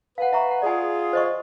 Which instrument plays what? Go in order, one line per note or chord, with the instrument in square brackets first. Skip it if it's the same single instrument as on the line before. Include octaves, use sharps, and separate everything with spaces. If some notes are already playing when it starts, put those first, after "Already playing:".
[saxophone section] B4 [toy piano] F5 F#5
[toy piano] E5 A#5 C#6
F#5
[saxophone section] F4 G#4 [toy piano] D5 G#5
[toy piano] C5 D#5 C#6